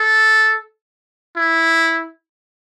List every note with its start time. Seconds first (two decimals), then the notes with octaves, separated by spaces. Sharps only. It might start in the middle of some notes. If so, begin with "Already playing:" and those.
Already playing: A4
1.37 E4